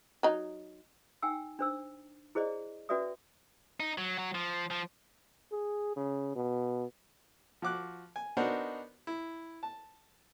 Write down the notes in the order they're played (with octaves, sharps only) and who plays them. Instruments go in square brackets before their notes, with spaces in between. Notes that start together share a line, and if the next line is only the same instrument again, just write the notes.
[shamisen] F#3 D#4
[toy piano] D#4 G5 G#5 E6
D4 C5 E6
E4 G#4 C5 D5 D#5
C#4 F#4 B4 D5 E5 D#6
[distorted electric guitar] D#4
F#3
F#3
F3
F3
[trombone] G#4
C#3
B2
[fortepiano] F3 F#4 D6 F#6
G#5
B3 D4 D#4 F#4 A#4 C5
E4
A5